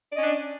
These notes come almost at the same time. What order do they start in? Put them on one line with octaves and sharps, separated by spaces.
D5 D#5 C#4 D4